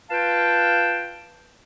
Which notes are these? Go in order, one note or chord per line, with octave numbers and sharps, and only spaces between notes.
F4 B4 F5 G5 A5